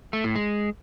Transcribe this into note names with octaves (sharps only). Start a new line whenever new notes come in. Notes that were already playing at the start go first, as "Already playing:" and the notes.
A3
A2
G#3